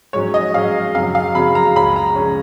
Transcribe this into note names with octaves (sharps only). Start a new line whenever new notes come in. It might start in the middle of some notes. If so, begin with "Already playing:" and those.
G#2 F#3 C#4 C#5
D#5
G#2 F#3 C#4 F5
F#2 C#3 F#3 F5
F5
F#2 C#3 F#3 B5
A#5
C#2 C#3 G#3 C#4 B5
A#5
C#3 G#3 C#4